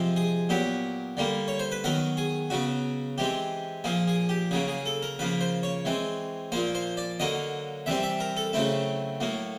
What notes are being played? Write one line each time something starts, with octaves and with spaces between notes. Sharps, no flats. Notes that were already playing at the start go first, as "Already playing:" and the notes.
Already playing: C3 F3 G#3 C4
G#4
A#2 F#3 B3 G4
D3 G3 A#3
C#5
C5
B4
D#3 F#3 B3 A#4
G#4
C#3 F#3 B3 F#4
E3 G#3 C4 G4
A#2 F3 A#3 G#4
G#4
G4
C#3 F#3 A#3 G#4
G#4
A4
A#4
C#3 F3 A#3 B4
C5
C#5
E3 G#3 C4
A#2 F3 A#3 C5
C5
D5
D3 F#3 A#3 D#5
C3 E3 G3 C4 E5
E5
A#4
A4
C#3 F#3 A3 C4 E4
A2 F#3 A#3